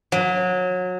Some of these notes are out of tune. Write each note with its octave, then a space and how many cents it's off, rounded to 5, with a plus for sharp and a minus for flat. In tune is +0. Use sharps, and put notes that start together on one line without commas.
F#3 -25